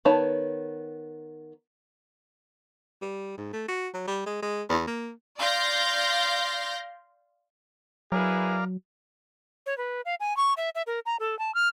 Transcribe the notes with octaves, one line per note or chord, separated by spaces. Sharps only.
D#3 B3 C#5 A5
G3
G#2
A3
F#4
F#3
G3
G#3
G#3
E2
A#3
D5 F5 C6 G6 A#6
F#3 E4 G#4 A#4 B4 D5 F5
C#5
B4
F5
G#5
C#6
E5
E5
A#4
A#5
A4
A5
F6